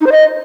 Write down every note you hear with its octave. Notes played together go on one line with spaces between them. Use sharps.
D#4
C5
D#5